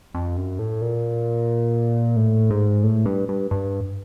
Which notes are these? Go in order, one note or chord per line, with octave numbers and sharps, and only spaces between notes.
F2
F#2
A2
A#2
A2
G#2
A2
G2
G2
G2